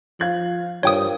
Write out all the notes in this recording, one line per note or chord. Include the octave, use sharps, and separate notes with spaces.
F3 F5 G#6 F#7
G2 F4 A#4 C5 C#5 G5 D#6